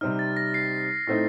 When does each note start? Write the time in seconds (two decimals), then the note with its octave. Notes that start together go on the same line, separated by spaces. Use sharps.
0.01 C3 G3 C4 D#4 F6
0.19 A6
0.37 A#6
0.54 C7
1.07 A2 A3 C4 D#4